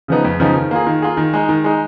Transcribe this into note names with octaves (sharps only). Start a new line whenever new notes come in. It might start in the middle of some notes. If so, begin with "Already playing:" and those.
C#3 F3 B3 D#4
F2
C#3 F3 B3 D#4
D#3
A#3 F4 G#4
D#3
A#3 F4 G#4
D#3
G#3 D#4
D#3
G#3 D#4